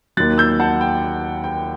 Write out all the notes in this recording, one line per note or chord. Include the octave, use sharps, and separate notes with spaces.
D#2 D#3 F#3 F#6 A6
E6 G6
F#5 A5
G5
G5